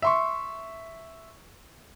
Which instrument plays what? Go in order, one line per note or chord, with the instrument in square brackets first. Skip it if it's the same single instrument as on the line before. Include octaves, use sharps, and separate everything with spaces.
[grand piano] E5 C6 C#6